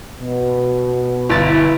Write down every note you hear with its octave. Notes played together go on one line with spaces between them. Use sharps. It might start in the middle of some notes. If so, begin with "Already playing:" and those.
B2
G1 E4 A6